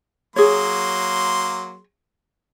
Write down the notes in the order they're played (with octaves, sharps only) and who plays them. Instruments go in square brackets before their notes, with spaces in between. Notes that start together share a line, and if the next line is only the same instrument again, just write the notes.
[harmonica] F#3 A#3 C6 [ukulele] G#4 C#5